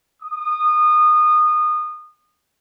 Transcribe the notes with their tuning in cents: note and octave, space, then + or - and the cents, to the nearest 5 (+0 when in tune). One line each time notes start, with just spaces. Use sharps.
D#6 -25